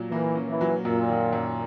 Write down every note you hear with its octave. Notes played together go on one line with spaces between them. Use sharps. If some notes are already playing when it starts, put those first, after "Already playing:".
Already playing: A#2 F#3
E3 A#3
C#4
E3
F#3
F#2 A#2
D#3
F#2